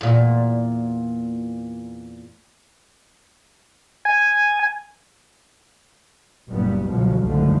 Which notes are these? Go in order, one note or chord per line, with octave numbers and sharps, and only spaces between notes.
E2 A#2
G#5
F#1 G2 A#2 G3 B3
G1 C#2 B2 F3 F#3
F#1 C2 G#2 D3 F3 A3